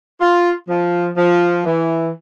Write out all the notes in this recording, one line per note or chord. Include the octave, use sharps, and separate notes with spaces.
F4
F3
F3
E3